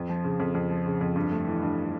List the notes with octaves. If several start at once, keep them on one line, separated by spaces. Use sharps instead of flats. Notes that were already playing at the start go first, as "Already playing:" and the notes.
Already playing: F2
F3
C#3
F2
F2
F3
C#3
F2
G2
A3
E3
G2